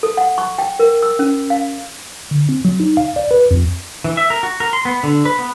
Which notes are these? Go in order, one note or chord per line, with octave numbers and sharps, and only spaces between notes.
A4
F#5
C#6
G5
A#4
E6
C#4
F5
D3
C4
F#3
D#4
F5
D5
B4
F2
E3
E5
A#4
F#4
A#4
C6
B3
D3
B4
B3